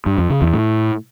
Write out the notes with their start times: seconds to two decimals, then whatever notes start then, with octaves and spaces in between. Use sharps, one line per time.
0.06 G2
0.18 F2
0.30 C#3
0.42 E2
0.53 A2